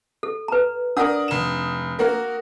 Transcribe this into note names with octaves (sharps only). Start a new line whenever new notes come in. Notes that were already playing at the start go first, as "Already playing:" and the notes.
A4
B4 A#5
D4 A#4 D5 F#5 D#6
F1 E7
A#3 F#4 A#4